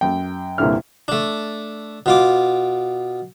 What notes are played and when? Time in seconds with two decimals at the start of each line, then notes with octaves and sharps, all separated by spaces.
0.01 F#2 G5
0.58 C2 G2 A#2 D3 E4 F6
1.08 A3 D4
2.06 B2 F4 D6